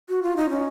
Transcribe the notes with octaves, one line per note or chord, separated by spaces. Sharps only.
F#4
F4
D#4
C#4